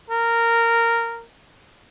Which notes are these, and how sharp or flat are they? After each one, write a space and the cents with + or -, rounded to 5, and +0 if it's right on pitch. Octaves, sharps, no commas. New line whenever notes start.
A#4 -10